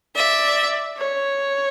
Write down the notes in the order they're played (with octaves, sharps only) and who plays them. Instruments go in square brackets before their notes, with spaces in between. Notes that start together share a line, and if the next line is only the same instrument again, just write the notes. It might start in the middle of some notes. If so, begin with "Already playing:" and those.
[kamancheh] D5 [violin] E5
[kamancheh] C#5